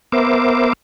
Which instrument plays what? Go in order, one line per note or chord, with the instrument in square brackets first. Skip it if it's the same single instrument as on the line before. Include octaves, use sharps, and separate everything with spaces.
[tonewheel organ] B3 A#4 C5 E5 D6